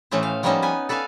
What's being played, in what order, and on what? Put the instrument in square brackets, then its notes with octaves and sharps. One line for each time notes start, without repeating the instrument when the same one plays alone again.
[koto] A2 E3 A3 C#4 G#4 C5
F5
F3 G3 A#3 B3 C#4 D#4
B3 B4 G#5
A4 B4 D5 F5 G#5